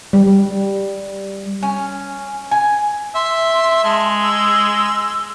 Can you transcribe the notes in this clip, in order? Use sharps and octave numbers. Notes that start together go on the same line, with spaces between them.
G3
C#4
G#5
E5 C6
G#3 A5
E6